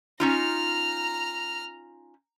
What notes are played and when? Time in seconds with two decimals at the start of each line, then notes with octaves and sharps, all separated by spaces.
0.20 C#4 D#4 F4 A#5 F6